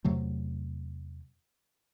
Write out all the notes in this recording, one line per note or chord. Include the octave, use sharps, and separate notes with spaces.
E2 C3 F#3 A3